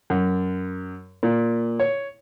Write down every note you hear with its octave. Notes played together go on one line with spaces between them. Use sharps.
F#2
A#2
C#5